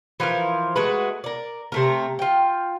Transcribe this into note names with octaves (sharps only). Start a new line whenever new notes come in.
E3 F3 F4 A#4
G#3 A3 F#4 B4
A#4 D5
C3 A3 A#4
F4 G5